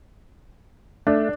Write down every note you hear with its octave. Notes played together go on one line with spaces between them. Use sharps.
A3 D4